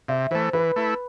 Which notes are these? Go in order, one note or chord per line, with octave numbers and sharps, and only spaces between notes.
C3 E5
E3 A3 C5
E3 B4
A3 E4